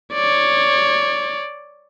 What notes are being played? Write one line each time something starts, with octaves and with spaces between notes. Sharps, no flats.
C#5 D5